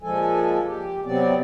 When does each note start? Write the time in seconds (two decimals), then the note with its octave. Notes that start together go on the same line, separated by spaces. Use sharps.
0.03 A#2 F3 G#3 A4 G#5
0.66 G4
1.05 C3 F#3 B3 C4 D5